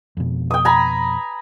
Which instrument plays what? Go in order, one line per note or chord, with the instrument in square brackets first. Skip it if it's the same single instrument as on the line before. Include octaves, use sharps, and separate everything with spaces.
[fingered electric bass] F2 B2
[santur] G5 D#6
G#5 A#5 B5